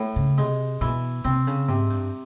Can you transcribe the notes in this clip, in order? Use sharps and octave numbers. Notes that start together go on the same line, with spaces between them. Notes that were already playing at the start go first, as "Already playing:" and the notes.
Already playing: A2
C#3
C3 G#3
B2 E3
C3 C4
C#3
G#2 C3
G2